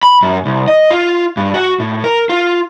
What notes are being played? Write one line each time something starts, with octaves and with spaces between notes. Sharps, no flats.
B5
F#2
C2
D#5
F4
G2
F#4
A2
A#4
F4